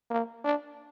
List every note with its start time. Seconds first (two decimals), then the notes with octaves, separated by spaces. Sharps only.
0.11 A#3
0.45 D4